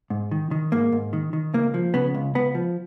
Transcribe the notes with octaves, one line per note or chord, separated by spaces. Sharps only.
G#2
D#3
D#3
G#2 A#3
G#2
D#3
D#3
C#2 A#3
F3
C#3 B3
C#2
C#2 B3
F3